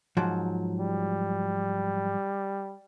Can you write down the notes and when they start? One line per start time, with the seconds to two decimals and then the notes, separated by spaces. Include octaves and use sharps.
0.17 G#2 F3 F#3
0.79 G3